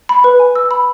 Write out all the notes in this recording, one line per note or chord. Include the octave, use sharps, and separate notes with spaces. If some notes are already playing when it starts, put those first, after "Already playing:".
B5
B4
G#5
E6
B5